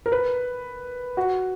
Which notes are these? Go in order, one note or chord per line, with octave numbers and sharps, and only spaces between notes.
A#4
B4
F#4